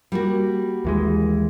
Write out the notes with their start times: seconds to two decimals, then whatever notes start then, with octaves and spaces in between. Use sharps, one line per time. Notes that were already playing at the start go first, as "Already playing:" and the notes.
0.12 G3 A#3 F#4
0.85 D#2 E3 G#3